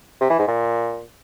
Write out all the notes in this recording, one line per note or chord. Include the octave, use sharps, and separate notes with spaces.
C3
E3
G#2
A#2